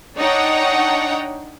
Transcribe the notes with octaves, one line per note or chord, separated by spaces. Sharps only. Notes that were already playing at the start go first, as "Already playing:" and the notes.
D4 D#4 C#5 F#5 G5